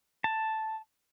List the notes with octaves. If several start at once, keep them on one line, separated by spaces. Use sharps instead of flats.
A5